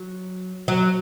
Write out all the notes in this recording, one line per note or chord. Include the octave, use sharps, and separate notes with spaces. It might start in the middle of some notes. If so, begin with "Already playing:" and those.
Already playing: F#3
F#3